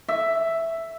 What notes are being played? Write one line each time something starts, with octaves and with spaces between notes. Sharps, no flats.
E5